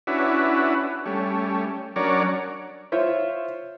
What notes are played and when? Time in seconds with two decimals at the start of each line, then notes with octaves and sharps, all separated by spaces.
0.07 C#4 D4 E4 F#4 B4
1.06 G3 A3 C#4
1.96 F#3 C#4 D4 A#4 C#5 D5
2.92 F4 C5 C#5 E5